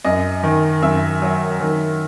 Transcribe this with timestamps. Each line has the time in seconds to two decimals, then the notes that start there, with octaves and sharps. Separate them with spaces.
0.04 F#2 D#5
0.43 D#3
0.82 F#2 E5
1.22 F#3
1.61 D#3